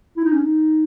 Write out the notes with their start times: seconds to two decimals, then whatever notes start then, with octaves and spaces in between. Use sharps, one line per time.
0.17 E4
0.25 D#4
0.33 C#4
0.40 D#4